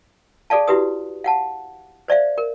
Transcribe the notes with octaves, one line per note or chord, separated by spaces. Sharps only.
G#4 A4 D5 F5 A5
E4 F#4 G4 B4 D#6
F5 F#5 A5
C5 D5 E5 F5
A#4